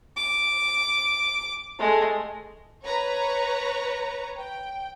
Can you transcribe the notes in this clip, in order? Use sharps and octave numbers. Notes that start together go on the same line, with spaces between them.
D6
G#3 A3
B4 C#5 A#5
G5